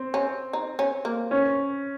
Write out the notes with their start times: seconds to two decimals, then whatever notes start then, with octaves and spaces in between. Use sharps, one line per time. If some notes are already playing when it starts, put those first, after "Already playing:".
Already playing: C4
0.14 C#4
0.53 D#4
0.79 C#4
1.05 A#3
1.31 C#4